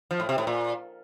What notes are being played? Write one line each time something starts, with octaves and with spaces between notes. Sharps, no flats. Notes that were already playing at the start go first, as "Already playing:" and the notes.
F3
A2
C3
A2
A#2